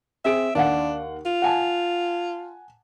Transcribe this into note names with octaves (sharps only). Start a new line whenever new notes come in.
C4 G#4 E5 D7
D#2 D4 F5 F#5
F4
F#5 G#5 A5